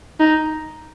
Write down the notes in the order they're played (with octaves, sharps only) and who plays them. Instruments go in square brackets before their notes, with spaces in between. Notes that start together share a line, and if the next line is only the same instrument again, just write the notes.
[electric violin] D#4